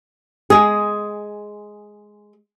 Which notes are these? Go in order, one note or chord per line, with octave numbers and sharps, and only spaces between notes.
G#3 G#4